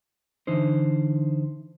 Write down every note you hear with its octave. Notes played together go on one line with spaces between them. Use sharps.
D3 E3 D#4 C5